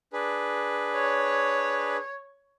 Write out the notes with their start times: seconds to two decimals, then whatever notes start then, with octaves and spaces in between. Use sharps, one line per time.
0.13 D4 G#4 B4
0.95 C#5